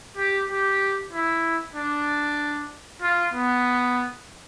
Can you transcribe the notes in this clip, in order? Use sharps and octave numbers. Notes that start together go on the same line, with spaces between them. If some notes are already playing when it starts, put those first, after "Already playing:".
G4
G4
E4
D4
F4
B3